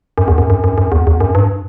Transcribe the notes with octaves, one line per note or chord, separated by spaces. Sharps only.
F#2
E2
F#2
F#2
F#2
F#2
E2
E2
F#2
G2